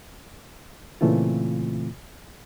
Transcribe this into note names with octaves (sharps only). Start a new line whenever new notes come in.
A#2 C#3 E3 A3 C4 F4